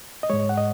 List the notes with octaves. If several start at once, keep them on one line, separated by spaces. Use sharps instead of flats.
D#5
G#2 G#3 C#5
F#5
D#5